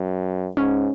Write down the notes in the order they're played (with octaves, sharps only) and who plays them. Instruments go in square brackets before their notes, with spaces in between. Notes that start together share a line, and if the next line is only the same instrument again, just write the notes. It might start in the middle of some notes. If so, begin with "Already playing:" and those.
Already playing: [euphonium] F#2
[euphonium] G#2 [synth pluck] C#4